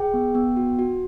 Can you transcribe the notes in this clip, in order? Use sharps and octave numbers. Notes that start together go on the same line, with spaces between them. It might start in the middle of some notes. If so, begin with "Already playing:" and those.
Already playing: G#4 G5
B3
B3
F#4
F#4